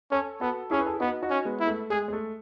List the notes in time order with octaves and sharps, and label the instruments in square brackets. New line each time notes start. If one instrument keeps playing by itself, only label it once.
[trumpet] C#4 [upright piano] A4 C#5
[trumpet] B3 [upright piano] F#4 A4
[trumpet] C#4 [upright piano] E4 G#4
[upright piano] B4
A4
G#4
[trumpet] B3 [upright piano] D#4 F#4
[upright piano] D#4 F#4
[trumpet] C#4
[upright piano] G#3 B3
[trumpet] E4
[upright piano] A3
[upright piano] G#3 [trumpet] G#4
[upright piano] G#3
A3